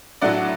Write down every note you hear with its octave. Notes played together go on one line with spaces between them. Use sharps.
A2 F#3 A3 D4 D5 F#5